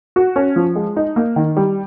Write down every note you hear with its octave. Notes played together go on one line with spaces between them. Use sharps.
F#4
C#4
F3
G#3
D#4
A#3
D#3
G3